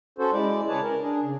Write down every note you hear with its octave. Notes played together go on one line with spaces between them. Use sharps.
C#4 F#4 A4 C5
G#3 E4 D5
C#3 G#4 B4 C#5 D5 A5
A#4
D4 G#4
C#3